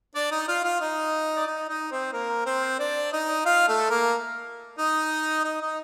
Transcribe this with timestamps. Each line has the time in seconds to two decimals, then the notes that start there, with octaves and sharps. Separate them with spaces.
0.15 D4 D5
0.31 D#4 D#5
0.48 F4 F5
0.64 F4 F5
0.80 D#4 D#5
1.36 D5
1.46 D#4 D#5
1.69 D#4 D#5
1.91 C4 C5
2.13 A#3 A#4
2.46 C4 C5
2.79 D4 D5
3.12 D#4 D#5
3.45 F4 F5
3.68 A3 A4
3.90 A#3 A#4
4.78 D#4 D#5
5.44 D#4 D#5
5.61 D#4 D#5